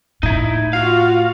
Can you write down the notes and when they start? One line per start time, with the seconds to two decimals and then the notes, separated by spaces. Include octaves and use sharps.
0.23 A2 D#4 E4
0.73 F4 F#4 F5